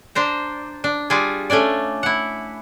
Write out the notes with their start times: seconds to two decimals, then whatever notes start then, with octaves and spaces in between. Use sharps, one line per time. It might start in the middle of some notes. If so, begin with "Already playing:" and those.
0.15 D4 C5 A#5
0.84 D4
1.10 G3 D4 F4 G#4
1.50 A3 C#4 D4 D5
2.03 E4 F#5